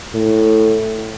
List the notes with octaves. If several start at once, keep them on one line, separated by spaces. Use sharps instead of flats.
A2